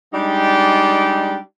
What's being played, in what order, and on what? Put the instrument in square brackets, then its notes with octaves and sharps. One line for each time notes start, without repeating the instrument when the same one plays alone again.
[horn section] G3 G#3 D4 D#4 G4